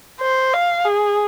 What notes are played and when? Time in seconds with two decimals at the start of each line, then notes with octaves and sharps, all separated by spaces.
0.21 C5
0.54 F5
0.86 G#4